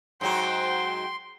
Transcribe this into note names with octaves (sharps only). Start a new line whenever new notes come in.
G#2 F#3 F#4 G5 C6